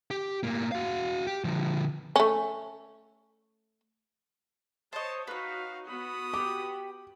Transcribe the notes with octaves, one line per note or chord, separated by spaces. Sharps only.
G4
A2 A#3
F#4 F5
G4
D3 F3
A3 C#4
C5 C#5 D#5 A5
D#4 F#4 B4 C#5 F5
B3 F#4 B5 D#6
G4 D6